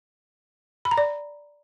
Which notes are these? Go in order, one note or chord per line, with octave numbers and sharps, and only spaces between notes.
B5
A#5
D5